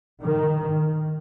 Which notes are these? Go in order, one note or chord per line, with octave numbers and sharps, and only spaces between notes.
D#3